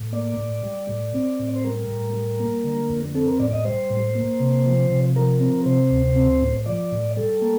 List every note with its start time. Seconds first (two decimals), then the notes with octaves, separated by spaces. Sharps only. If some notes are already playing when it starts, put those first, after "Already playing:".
Already playing: A2
0.13 A#3 D5
0.38 A2
0.63 G3
0.89 A2
1.14 C4
1.39 A2
1.56 C5
1.64 G3 A#4
1.89 A2
2.14 G3
2.40 A#3
2.64 D3
2.89 F2
3.15 C4 A4
3.27 A#4
3.39 A2 D5
3.53 D#5
3.65 G3 C5
3.90 A2
4.15 A#3
4.40 C3
4.66 F3
4.90 C3
5.16 F3 A#4
5.40 C4
5.66 C3 C5
5.90 D2
6.16 C4
6.41 A2
6.66 F3 D5
6.92 A2
7.17 G3 A4
7.42 A#3